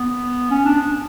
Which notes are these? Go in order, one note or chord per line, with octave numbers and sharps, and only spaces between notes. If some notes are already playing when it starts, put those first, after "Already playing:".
Already playing: B3
C#4
D4